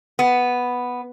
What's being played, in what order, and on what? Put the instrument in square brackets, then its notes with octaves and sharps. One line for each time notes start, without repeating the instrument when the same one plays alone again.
[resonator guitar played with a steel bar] B3